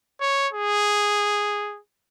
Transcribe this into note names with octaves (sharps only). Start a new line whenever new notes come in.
C#5
G#4